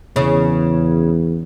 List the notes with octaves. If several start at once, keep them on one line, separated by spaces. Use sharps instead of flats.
E2 C#3